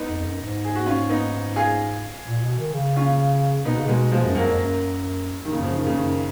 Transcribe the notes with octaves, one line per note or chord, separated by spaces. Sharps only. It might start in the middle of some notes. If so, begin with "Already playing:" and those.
Already playing: B3 D#4
F2
F2
F#2
G#2
G#4
F#4
C#4 F4
B3 D#4
F4 G#4
A#2
B2
D#3
C#3
C#4 F4
B2 B3 D#4
C#3
B2 G#3 B3
B2 F3 G#3
F#2
F#2 F#3 A#3
F2
F#2
D#3
F#2 C#3
C#3 F3
D#3
C#3
F#2 D#3